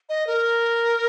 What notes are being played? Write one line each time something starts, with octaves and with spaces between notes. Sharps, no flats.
D#5
A#4